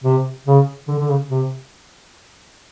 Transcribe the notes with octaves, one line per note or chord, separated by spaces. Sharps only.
C3
C#3
D3
D3
C#3
C3